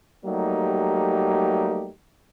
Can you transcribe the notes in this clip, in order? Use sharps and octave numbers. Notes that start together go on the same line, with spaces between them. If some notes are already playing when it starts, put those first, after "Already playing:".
F#3 G3 A3 A#3 D#4 G4